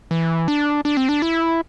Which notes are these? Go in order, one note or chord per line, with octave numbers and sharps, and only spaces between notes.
E3
D4
D4
C4
D4
E4